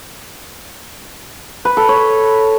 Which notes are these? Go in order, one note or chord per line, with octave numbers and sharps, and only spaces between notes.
B4
A4
C#5